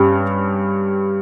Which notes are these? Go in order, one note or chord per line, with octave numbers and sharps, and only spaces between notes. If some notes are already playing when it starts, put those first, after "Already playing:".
Already playing: G2 G3 C#4